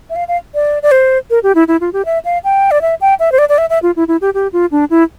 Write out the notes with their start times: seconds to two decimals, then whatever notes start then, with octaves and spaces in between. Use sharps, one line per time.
0.10 E5
0.16 F5
0.28 F5
0.55 D5
0.83 D5
0.91 C5
1.30 A#4
1.43 G4
1.55 E4
1.68 E4
1.81 F4
1.93 G4
2.05 E5
2.25 F5
2.44 G5
2.71 D5
2.81 E5
3.01 G5
3.20 E5
3.32 C5
3.38 D5
3.49 D5
3.58 E5
3.70 E5
3.82 F4
3.96 E4
4.08 E4
4.21 G4
4.34 G4
4.53 F4
4.72 D4
4.90 E4